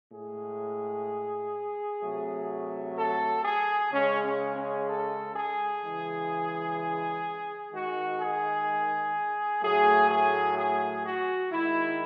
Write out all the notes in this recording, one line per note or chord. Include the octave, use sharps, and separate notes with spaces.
A2 G#3 G#4
C3 F#3 A3
A4
G#4
C#3 G#3 C#4
C#4
C#4
A4
G#4
C#3 E3 G#3
D#3 G#3 F#4
G#4
A2 F#3 A3 G#4
G#4
G#4
F#4
D#3 G#3 E4